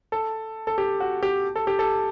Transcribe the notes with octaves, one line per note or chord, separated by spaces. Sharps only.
A4
A4
G4
F#4
G4
A4
G4
A4